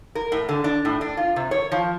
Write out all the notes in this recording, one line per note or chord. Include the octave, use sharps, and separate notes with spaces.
A#4
A2
D3
D4
A2
D4
F4
C3
C#5
F3